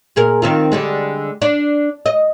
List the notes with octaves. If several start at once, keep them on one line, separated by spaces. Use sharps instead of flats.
A#2 G#4 A#4
D#3 C4 F4
D3 G3 G#3
D4
D#5